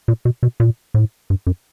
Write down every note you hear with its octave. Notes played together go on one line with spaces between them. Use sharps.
A#2
B2
B2
A#2
A2
G2
F#2